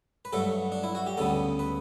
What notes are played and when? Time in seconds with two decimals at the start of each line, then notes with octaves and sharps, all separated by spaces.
0.25 B4
0.33 G2 F#3 A3 A4
0.72 D4
0.83 E4
0.95 F#4
1.07 G4
1.17 D2 C#3 G3 B3 A4
1.59 B4